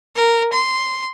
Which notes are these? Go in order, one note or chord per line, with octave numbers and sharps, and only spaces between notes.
A#4
C6